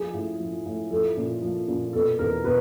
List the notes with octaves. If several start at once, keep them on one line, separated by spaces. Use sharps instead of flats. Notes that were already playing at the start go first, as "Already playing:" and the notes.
Already playing: F3 G#4
A2
F3
A2
F3 A4
A#2
F3
A#2
B2 A4
E2 A#4
B2 B4